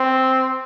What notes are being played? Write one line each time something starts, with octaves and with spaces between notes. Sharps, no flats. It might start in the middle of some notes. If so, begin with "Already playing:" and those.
Already playing: C4